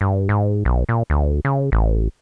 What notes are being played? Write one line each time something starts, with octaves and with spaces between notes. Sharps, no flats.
G2
G#2
B1
A#2
D2
C#3
A1